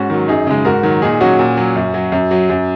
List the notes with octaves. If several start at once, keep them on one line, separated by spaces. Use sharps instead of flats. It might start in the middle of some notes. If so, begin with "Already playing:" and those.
Already playing: G#2 C#4 F#4
D#3 F#3
F#2 D#4 G#4
C#3 G#3
G#2 F#4 A#4
D#3 F#3
A#2 D#4 G#4
F#3 C#4 F#4
A#2
F#3
F#2
F#3
F#2
F#3
F#2